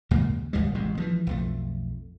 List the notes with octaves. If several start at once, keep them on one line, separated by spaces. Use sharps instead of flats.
D#2 G#2 C#3 A#3
D1 D#2 G3 G#3
A1 C3 G#3
E3 F3 G#3
B1 F2 A3